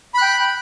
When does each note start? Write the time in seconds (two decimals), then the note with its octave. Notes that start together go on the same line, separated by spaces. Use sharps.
0.14 B5
0.18 F#6
0.22 G5